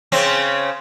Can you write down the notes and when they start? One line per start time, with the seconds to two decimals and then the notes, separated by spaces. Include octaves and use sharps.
0.12 C#3 C4 C#4